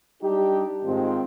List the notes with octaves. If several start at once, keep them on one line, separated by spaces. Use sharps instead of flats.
G3 D4 D#4 G4
G#2 D#3 G#3 C4 F4